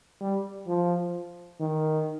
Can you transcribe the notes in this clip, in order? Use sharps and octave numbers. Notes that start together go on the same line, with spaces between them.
G3
F3
D#3